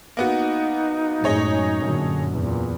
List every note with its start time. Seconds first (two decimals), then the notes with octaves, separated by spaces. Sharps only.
0.17 A#3 B3 D#4 F#4
1.24 F#2 A2 G#3 G#4 C#5 D#5
1.80 F#2 A#2 D3
2.36 E2 A#2